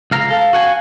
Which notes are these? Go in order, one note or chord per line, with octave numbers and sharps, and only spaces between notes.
C#2 F5 A#5
A4 F5
F#4 F#5 G#5